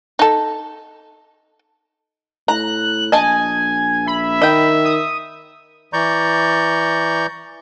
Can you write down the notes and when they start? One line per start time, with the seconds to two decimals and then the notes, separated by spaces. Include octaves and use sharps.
0.19 D#4 A4
2.48 A2 A#5 F#6
3.12 A#1 D#5 G#5 A5
4.08 E5 B5
4.42 D#3 D#5 G5
4.85 D#6
5.93 E3 D5 A#5 C#6 G6